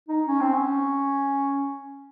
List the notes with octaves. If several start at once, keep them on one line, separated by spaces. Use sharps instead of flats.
D#4
C#4
C4
C#4